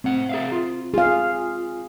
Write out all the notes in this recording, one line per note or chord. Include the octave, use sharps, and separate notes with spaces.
A2 C4 F#5
G#4 E5 F5
F4
F4 G#4 F5